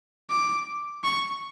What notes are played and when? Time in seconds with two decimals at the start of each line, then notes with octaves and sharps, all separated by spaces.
0.30 D6
1.04 C#6